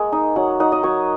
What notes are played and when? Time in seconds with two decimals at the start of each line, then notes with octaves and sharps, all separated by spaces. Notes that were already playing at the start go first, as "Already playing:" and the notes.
Already playing: G#3 A#3
0.12 D#4
0.36 F#3 F#5
0.60 D#4 F#5
0.72 D#5
0.83 F#3 C#5